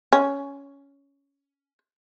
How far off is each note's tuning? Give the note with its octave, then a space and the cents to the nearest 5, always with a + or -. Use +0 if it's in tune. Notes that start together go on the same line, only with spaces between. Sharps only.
C#4 +10